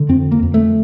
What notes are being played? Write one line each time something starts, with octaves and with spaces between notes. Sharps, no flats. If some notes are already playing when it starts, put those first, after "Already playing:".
Already playing: D3
F2 C4
A#3
F2
A3